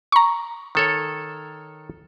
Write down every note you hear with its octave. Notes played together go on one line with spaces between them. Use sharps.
A#5 C#6
D#3 A4 C#5